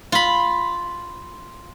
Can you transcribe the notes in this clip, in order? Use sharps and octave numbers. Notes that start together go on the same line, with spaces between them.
F4 B5